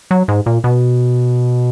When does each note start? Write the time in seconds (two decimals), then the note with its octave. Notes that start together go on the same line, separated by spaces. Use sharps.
0.11 F#3
0.28 G#2
0.46 A#2
0.64 B2